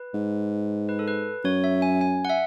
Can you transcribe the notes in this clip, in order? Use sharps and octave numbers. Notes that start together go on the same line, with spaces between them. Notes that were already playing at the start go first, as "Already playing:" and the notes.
Already playing: B4
G#2
B4
A4
B4
F#2 C#5
E5
G#5
G#5
F#5
E5